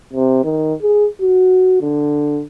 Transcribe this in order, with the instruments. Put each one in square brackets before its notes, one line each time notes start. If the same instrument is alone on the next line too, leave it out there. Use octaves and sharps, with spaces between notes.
[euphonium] C3
D#3
G#4
F#4
D3